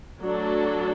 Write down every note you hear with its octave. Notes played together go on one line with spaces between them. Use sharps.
F#3 A3 D4 A4